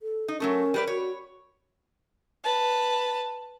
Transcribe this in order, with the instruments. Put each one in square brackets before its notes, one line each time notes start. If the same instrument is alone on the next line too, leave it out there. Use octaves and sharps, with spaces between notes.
[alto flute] A4
[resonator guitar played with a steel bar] D#4 [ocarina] D#5
[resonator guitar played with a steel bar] F#3 A3 A4 [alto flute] C#4 [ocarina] A#4
[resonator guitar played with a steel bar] G3 B4 D5
[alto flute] F#4 [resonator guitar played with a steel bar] C#5
[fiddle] B4 A5